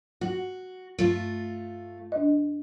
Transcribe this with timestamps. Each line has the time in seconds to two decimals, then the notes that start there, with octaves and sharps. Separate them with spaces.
0.21 F#4 F#5
0.98 G2 A3 F4
2.12 D4 D#5